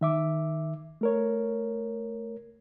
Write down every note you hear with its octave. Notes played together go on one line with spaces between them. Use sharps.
D#3 E5 D6
A3 A#4 C#5